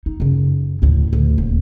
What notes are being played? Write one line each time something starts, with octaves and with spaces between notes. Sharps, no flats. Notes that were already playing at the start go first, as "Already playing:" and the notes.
D#4
F#2 C#3
D2 A2
D2
D#1